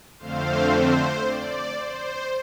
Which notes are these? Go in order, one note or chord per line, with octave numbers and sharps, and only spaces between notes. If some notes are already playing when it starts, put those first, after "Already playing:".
F2 D3 A3 C4 C5 F5
C5
D5
C5